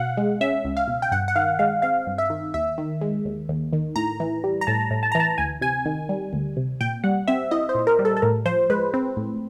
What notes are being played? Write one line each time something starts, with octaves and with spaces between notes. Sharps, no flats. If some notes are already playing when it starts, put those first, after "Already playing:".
Already playing: B2 F5 F#5
G#3
C#4 E5
C#2
F5
B2
G5
G2 F#5
F#5
D#3 F5
G#3 F5
C4 F5
G2
E5
D#3
D#2 E5
D#3
G#3
D#2
D#2
D#3
A2 A#5
E3
G3
A#5
A2 A5
A2
A5
E3 A#5
A5
D2 G#5
C3 G#5
D#3
G3
D2
C3
A#2 G5
G3 F#5
C4 E5
E4 D#5
C5
A#2
A#4
G3
A4
A4
A2 A#4
F3 C5
G#3 B4
C4
A2